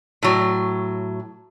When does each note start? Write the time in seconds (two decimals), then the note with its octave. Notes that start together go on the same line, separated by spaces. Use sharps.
0.23 A2 F#3